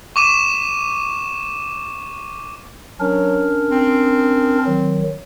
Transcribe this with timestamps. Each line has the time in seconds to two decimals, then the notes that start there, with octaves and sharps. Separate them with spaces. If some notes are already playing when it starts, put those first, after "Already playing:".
0.16 C#6 D6 D#7 E7
3.00 F#3 C#4 D4 A#4
3.71 C4
4.67 D#3 F#3